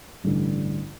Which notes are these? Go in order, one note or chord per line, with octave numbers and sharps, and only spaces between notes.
A1 G2 D3